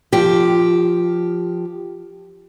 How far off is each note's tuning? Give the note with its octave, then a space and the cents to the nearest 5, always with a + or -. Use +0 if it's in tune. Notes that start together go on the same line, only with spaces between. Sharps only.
F3 +0 G4 +0